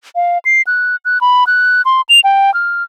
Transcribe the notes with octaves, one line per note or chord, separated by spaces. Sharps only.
F5
C7
F#6
F#6
B5
F#6
C6
F7
G5
F6